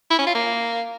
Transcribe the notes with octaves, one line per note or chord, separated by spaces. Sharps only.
E4
C#4
F4
A#3